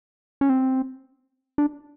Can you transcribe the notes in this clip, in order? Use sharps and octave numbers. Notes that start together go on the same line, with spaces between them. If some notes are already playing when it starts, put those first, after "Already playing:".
C#4
C4
D4